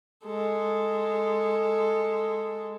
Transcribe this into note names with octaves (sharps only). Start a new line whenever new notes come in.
G#3 A4